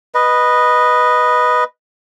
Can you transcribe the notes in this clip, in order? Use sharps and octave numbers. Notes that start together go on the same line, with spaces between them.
B4 D#5